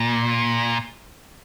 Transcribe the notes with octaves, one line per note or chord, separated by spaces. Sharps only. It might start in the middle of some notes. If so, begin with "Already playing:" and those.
Already playing: A#2